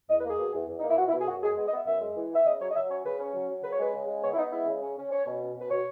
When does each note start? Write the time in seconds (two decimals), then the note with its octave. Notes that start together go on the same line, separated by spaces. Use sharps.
0.10 E2 D#5
0.19 B4
0.24 A#3
0.29 G#4
0.39 B2
0.54 E2
0.69 E2
0.80 A#3 D#4
0.89 E4
0.98 B2 F#4
1.08 E4
1.13 B2
1.20 G#4
1.28 F#2 F#4
1.42 G#3 G#4
1.57 B3 D#5
1.67 D#5
1.72 B3 E5
1.87 F#2 E5
2.01 G#3
2.16 E3
2.31 B3 E5
2.45 C#3 D#5
2.60 F#3 C#5
2.71 D#5
2.75 F#3 E5
2.90 C#4 C#5
3.05 C#3 B4
3.20 C#4
3.34 F#3
3.49 F#3
3.64 C#3 B4
3.72 C#5
3.79 G#3 B4
3.94 C#3
4.08 G#3
4.23 B3 C#5
4.34 E4
4.37 B3 D#4
4.52 G#3 E4
4.67 C#3
4.82 C#4
4.97 C#4
5.12 C#4 C#5
5.26 B2
5.41 C#4
5.56 B2
5.61 B4
5.70 B2 C#5